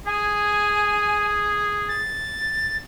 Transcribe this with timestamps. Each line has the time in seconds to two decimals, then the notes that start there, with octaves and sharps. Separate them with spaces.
0.07 G#4 G#5
1.89 A6